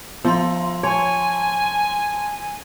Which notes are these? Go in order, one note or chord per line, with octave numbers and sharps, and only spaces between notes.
F3 B3 F4 C6
C#5 G#5 A5 C6